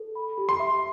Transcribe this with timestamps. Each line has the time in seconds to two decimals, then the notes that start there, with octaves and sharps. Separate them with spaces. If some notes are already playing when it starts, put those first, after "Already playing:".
Already playing: A4
0.15 B5
0.38 G4
0.49 C6
0.60 E5